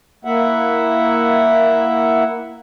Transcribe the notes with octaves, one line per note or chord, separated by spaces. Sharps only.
A#3 E4 E5 F#5